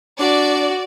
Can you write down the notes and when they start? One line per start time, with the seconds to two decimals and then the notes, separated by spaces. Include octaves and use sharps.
0.19 D4 F#4 D5